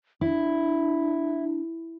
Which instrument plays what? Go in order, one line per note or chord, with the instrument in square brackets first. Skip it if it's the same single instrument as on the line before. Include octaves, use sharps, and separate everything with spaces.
[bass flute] D4 [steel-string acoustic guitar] E4